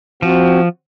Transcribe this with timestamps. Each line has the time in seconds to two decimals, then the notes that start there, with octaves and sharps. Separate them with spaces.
0.22 F3 C4 F#4